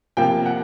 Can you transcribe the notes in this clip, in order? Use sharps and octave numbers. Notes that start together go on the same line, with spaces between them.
C3 F3 A#3 G5
F#5